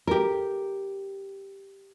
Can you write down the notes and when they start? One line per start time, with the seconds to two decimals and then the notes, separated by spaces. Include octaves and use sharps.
0.07 G4 A#4